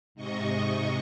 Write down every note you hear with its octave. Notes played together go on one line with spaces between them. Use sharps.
G#2 C3 D#5 C#6